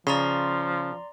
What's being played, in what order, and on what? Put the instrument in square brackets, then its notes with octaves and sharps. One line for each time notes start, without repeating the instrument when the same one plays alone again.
[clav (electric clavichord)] C#3 [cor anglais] F3 [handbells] D5 A#5 C6